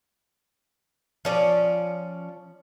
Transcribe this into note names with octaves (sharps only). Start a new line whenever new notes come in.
F3 C#4 D5